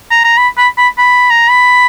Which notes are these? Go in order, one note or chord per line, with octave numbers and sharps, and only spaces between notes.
A#5
A#5
B5
B5
B5
B5
A#5
B5